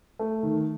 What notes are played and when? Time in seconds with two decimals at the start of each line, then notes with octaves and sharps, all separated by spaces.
0.19 A3
0.43 D#3